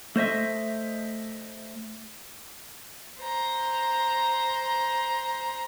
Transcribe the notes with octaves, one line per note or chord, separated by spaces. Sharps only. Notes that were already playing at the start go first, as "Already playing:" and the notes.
A3 C5 D#5 E5
C5 A#5